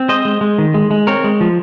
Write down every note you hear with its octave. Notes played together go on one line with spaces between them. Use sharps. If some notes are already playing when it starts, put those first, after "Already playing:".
Already playing: C4
G#3 C5 D#5
G#3
G#3
D#3
G#3
G#3
C4 A#4 C#5
G#3
F3